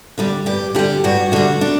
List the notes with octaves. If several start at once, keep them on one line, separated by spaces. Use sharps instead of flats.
D3 G3 G4
G2 G4
D3 G3 G4
G2 F#4
D3 G3 F#4
D4